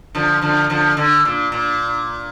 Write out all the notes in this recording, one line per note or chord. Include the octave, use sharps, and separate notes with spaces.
D3 F3
D3 F3
D3 F3
D3
A#2
A#2